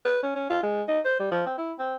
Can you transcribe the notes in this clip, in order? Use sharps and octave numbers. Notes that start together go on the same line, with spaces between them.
B4
C#4
C#4
F4
G#3
D#4
C5
G3
F3
C4
E4
C4